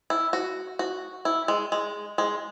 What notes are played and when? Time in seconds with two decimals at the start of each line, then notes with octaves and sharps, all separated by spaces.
0.10 E4
0.33 F#4
0.79 F#4
1.25 E4
1.48 G#3
1.72 G#3
2.18 G#3